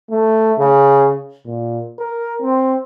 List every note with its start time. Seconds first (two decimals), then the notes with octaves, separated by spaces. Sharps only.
0.11 A3
0.59 C#3
1.46 A#2
1.99 A#4
2.41 C4